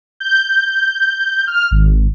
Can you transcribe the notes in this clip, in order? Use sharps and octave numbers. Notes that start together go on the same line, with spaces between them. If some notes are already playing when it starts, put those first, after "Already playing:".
G6
F6
G#1